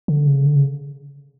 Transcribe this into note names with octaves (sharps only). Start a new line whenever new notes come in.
D3
C#3
D3
C#3